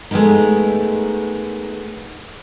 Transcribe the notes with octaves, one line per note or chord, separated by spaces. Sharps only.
G#3 A3 B3 D#4 A#4